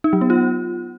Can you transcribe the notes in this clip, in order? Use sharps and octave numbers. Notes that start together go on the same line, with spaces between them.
D#4
F#3
B3
F4